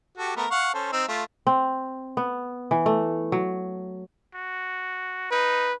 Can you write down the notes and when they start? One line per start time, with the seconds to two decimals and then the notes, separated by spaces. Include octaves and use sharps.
0.18 F#4 G4 A4
0.36 A3 B3 A#4
0.51 F5 F#5 C#6
0.74 C#4 A4 C5
0.92 C4 D#4 E6
1.08 A3 F4
1.47 C4
2.17 B3
2.71 E3
2.86 A3
3.32 F#3
4.35 F#4
5.32 D#4 B4